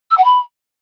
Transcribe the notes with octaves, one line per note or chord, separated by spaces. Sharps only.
E6
F#5
B5